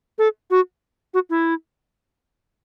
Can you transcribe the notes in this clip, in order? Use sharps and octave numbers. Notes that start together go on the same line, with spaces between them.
A4
F#4
F#4
E4